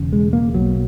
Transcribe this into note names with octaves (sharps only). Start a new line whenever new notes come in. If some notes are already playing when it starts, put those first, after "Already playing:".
Already playing: E1 E2 C#3
G#3
A#3
B1 B2 F#3